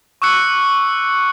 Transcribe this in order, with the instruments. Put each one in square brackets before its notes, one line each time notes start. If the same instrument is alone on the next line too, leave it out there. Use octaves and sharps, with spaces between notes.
[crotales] C#6 D6 E6 F#6 C#7